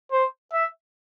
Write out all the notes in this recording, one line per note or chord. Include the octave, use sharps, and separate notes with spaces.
C5
E5